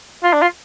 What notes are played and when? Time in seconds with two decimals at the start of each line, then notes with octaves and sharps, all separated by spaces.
0.24 F4
0.33 D4
0.42 F4